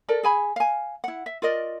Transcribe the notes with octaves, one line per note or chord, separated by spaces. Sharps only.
A4 A#4 D5
G#4 G#5 B5
F5 G#5
E4 F#5
E5
F4 A#4 D5 D#5